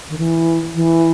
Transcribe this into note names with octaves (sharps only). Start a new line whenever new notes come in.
D#3
E3
E3